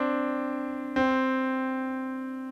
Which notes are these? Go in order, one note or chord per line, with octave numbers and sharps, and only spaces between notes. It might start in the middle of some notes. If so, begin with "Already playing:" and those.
Already playing: C4 D4
C4